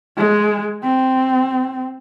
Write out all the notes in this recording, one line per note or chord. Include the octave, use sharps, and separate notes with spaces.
G#3
C4